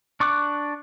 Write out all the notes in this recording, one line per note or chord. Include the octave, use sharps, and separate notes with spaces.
D4 C#6 D6 F#6